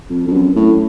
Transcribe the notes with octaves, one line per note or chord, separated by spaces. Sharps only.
F2
F2
F#2
A2